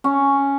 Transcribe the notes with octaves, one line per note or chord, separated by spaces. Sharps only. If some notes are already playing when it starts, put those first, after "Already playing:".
C#4